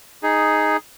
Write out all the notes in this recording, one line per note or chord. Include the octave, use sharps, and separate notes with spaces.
D#4 G#4